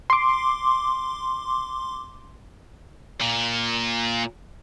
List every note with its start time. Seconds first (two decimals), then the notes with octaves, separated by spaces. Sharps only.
0.10 C6 D6
3.21 A#2